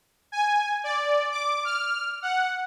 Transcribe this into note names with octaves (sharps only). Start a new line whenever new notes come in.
G#5
D5
D6
F6
F#5